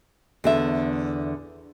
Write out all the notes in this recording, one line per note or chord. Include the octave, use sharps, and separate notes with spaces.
E2 D3 E5